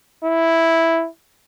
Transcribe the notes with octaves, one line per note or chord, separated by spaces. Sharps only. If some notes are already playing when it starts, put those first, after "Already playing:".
E4